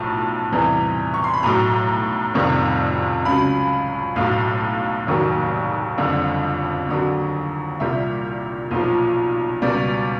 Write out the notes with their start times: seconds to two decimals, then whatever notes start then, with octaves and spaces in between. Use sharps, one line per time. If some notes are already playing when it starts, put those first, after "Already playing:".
Already playing: B1 A2 F3 A5
0.52 E2 C3 E3 G3
1.14 C#6
1.24 C6
1.33 B5
1.43 B1 A2 F#3 A#5
2.34 F1 F2 C3 D#3 G3
3.25 C#2 C#3 F#3 B5
4.16 B1 A2 F#3 F5
5.07 F1 D#2 D#3 F#3
5.98 F#1 F2 D3 G3
6.89 D#2 D3 F#3
7.80 C2 A#2 G3 E5
8.71 B1 A#2 F3
9.62 C#2 B2 G3 D5